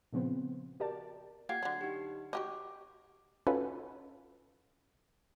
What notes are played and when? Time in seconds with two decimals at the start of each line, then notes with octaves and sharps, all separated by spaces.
0.13 A#2 C#3 F3 B3 C4
0.80 F#4 G4 A#4 D5 A5
1.49 A#3 F4 G4 F#5 G#6 C7
1.63 D3 F#3
1.81 D#4 G4
2.33 F#4 G4 D#5 D6
3.47 C#4 D#4 F4 F#4 A4 B4